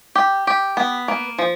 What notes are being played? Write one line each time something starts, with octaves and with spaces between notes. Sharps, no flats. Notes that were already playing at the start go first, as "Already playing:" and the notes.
G4
G4
B3
A#3
F3